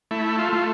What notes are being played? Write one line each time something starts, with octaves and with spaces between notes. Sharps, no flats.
A3 E4
F4
A3